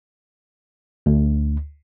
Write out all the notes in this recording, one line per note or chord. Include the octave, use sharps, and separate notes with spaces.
D2